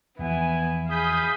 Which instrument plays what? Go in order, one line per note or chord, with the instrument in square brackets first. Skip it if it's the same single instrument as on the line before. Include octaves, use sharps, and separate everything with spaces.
[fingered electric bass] E2 E3 F3 [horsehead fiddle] B3 G#5 [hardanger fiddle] E4
[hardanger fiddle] G#4 B5 [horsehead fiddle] F5 [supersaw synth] D#6 G6 B6